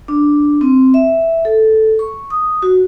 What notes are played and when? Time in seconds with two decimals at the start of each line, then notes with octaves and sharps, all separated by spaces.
0.08 D4
0.61 C4
0.94 E5
1.45 A4
1.99 C#6
2.30 D#6
2.62 F#4